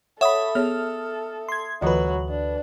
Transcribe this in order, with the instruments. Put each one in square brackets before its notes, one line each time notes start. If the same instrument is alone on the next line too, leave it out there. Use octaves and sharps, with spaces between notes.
[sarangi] A4 [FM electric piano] C#5 B5 [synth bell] E5 D#6 [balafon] F#5
[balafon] B3 G#4 C#5 [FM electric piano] F6
[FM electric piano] C6 G#6
[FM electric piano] D2 B4 [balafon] E3 F4 D#5 [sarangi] F#3
[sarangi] D4